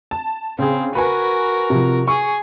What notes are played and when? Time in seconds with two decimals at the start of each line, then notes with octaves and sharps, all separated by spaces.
0.11 A5
0.59 C#3 C4 G#4
0.95 F#4 A#4 B4 G#5
1.70 C3 F3
2.08 G#4 C#6